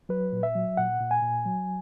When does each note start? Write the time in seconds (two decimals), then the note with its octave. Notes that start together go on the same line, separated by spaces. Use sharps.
0.09 F#3 B4
0.32 A#2
0.43 E5
0.55 F#3
0.77 A#2 F#5
1.00 A#2
1.11 G#5
1.22 A#2
1.45 F#3